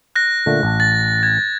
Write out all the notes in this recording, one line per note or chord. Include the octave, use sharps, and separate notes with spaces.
F#6 A#6
A#2 D3 A3
A1 A5
A6
G#6